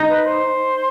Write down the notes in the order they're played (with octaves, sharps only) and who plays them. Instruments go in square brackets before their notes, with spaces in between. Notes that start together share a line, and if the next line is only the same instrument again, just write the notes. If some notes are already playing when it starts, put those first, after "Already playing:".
Already playing: [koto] D#4
[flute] B4
C5